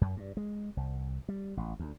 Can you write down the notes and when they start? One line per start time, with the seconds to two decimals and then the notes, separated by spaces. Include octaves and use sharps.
0.01 F#2
0.17 G2
0.37 G#3
0.77 C2
1.29 G3
1.57 A1
1.79 D2